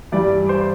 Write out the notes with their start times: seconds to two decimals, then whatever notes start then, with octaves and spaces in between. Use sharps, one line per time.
0.12 G2 E3 G3 D5
0.49 C5